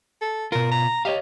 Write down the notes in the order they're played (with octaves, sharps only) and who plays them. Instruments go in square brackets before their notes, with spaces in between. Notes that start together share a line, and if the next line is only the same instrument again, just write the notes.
[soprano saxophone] A4
[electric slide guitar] B2 F4 [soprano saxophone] A#4
[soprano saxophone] A#5
[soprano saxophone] G4 [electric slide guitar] C#5 D#5 F5